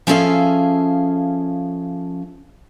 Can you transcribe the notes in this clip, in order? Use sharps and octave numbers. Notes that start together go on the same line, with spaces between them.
F3 C#4 G#4 A4 E5 F5